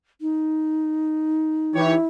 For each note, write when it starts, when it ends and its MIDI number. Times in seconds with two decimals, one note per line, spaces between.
0.21 1.96 63
1.74 1.95 52
1.74 2.08 64
1.74 1.95 67
1.74 1.95 73